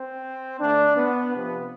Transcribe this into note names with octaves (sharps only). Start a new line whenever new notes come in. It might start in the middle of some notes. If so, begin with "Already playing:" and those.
Already playing: C4
D3 A3 D4
B3
C3 F3 B3